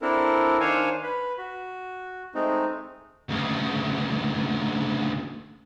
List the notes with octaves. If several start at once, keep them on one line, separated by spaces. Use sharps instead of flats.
C4 D4 E4 A4 A#4
D#3 D4 C5 C#5 F5 G#5
B4
F#4
G#3 A3 C4 D#4
D2 C#3